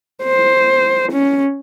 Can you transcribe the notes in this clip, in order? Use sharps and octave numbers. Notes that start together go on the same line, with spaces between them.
C5
C#4